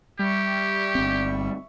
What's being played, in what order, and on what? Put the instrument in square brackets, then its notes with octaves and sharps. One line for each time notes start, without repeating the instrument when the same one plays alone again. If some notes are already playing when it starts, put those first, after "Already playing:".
[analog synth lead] G3 [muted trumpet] G4 [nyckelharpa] E5 C#6
[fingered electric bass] G1 C4